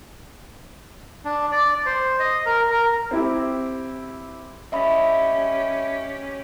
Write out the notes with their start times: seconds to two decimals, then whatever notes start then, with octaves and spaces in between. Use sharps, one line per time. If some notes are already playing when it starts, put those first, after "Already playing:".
1.25 D4
1.52 D5
1.86 C5
2.20 D#5
2.46 A#4
2.71 A#4
3.11 C4 E4 G4
4.72 C#4 G4 D#5 E5 B5